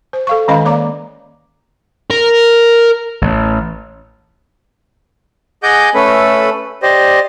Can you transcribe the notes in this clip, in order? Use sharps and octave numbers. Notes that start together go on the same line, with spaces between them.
C5
A4 F5 C#6
D#3 G#3 C#4 D#5 F5 B5
A#3 C#5 D5 A#5 D6
A#4
A1
G#4 D#5 F#5 G#5 D6 G6
A3 C#4 A4 B4 B5
G4 C5 D5 D#5